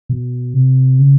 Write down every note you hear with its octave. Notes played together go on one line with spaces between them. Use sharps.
B2
C3
C#3